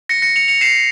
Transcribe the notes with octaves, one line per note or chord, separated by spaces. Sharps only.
A#6 C#7
A#6 C#7
C#7 F7
C#7 F7
C7 E7